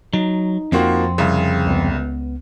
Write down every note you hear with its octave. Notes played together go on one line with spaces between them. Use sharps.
F#3 D#4
F2 F3 A#3 C4 F#4
C2 C#3 G#4
C#2 B3